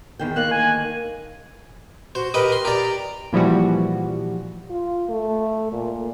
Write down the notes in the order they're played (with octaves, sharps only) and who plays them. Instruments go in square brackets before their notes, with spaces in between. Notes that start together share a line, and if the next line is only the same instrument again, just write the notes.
[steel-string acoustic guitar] E2 D#3 G5
[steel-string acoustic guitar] D2 D#3 A#3 [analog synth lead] F#6
[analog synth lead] G#5
[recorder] F#4 [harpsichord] C5
[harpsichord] G4 B4 D#5 [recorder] A#4
[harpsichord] C6
[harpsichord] G4 D5 [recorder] A#5
[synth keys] A#2 E3 F3 G3 F#4
[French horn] F4
A3
A#2